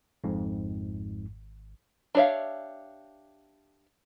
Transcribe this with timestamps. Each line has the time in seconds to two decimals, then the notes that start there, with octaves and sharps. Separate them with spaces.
0.24 G#1 F2 G#2
2.15 D4 G4 C#5 E5 F5